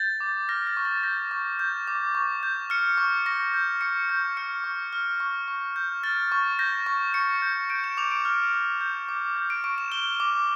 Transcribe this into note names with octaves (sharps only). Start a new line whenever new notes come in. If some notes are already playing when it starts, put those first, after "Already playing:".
Already playing: G6 A6
D6
F6 A#6
A6
C#6
A6
G6 A#6
C#6
G6
D6
C#6
G6
F6 C#7
C#6
C#6 A#6
G6
C#6 C#7
G6
F6 C#7
C#6
F6
C#6
C#6
G6
F6 A6
C#6
G6 A#6
C#6
C#6 C#7
G6
G6 D7
E7
D6 F7
D7
F6
D6
G6
D6
G6
D7
C#6 D7
E7
F6 G7
D6